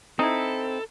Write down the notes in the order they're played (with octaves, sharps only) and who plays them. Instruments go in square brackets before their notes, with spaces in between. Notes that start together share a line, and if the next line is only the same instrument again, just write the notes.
[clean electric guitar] C4 [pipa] D#4 E4 [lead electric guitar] A4